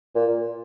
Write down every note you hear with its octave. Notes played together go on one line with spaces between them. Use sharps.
A#2